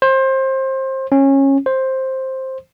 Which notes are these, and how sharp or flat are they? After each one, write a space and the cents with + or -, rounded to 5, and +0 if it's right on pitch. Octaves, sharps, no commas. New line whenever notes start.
C5 +25
C#4 -20
C5 +10